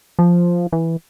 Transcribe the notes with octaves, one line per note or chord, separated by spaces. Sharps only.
F3
E3